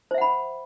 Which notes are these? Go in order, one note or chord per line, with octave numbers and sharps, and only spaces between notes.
C5 E5 F#5 B5